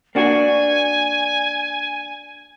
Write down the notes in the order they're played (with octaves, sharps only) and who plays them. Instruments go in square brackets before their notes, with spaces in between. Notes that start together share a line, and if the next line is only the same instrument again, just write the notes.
[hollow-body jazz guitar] A#3 D4 F#4 [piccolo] G#5